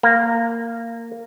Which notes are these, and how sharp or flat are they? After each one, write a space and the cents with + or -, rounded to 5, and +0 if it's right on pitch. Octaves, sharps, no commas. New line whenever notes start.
A#3 -15